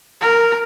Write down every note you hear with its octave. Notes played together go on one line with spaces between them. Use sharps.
A#4